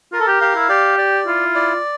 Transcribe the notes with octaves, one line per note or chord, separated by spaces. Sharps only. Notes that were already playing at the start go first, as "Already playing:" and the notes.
F4 A#4
A4
G4
G4 F5
E4
G4 D5
D5
E4 F4
D5